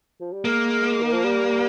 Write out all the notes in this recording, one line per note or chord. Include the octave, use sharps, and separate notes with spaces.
F3
G3
G#3 A#3
D#3
F3
G3